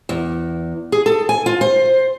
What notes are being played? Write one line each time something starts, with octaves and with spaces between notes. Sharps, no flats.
E2
G#4
A4
G#5
F4
C5